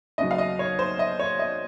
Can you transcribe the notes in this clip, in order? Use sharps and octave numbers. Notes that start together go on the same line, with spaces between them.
D#2 C#3 F#3 D#5
F5
D#5
C#5
C5
D#5
C#5
D#5